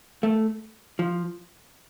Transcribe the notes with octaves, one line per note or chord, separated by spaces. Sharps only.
A3
F3